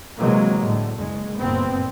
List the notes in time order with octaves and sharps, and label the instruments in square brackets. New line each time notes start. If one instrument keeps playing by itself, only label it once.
[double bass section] C3 E3 F#3 G#3 A#3
A2 D3
F#1 G#3
F#1 G2 A#2 B3 C4